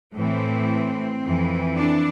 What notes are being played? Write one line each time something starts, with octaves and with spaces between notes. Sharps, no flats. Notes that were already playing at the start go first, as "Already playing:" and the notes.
A2 E3 C4
F2 E3
D4